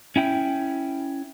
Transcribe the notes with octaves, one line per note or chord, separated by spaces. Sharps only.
C#4 E4 G5